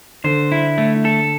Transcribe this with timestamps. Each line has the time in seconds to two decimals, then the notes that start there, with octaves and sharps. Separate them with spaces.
0.24 D3 C5
0.52 E4
0.78 A3
1.05 A4